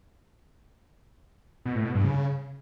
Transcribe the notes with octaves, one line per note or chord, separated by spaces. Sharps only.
B2
A2
B2
G2
C#3